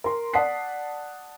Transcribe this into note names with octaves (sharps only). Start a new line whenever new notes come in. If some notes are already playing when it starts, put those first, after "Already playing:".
A#4 C6
D5 F#5 A5 D#6 B6 C7